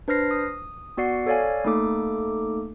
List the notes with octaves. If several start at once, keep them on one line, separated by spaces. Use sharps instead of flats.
D4 B4 C5 F6 A#6 C7
D#6
B3 F#4 D5 F#5 C7
A4 C#5 D5 F5 G#5
A3 A#3 D#4 A4 D6